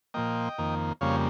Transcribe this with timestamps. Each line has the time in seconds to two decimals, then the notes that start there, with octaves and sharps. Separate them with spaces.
0.14 A#2 F3 A#3 D#5 G5
0.58 F2 D#3 A#3
1.01 F2 C#3 G3 A#3 C#5 F5